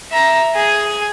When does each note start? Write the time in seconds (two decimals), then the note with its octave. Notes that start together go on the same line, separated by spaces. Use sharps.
0.11 E5 A#5
0.55 G#4 G#5